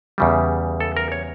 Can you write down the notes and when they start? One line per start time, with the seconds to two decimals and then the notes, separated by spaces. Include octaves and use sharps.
0.18 E2 C#3 G3
0.80 A4
0.97 A#4
1.12 C#5